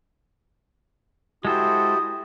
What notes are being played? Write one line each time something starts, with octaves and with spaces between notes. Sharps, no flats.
G#3 E4 F#4 G4 A4 C5 D#6